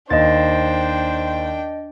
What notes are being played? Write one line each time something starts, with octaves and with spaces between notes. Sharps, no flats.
D#2 D4 C5 D#5 G5 A6